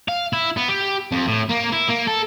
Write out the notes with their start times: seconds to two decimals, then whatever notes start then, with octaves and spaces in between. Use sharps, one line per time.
0.08 F5
0.33 E4
0.57 B3
0.68 G4
1.12 F2
1.26 A2
1.49 A#3
1.72 E4
1.89 A#3
2.07 A4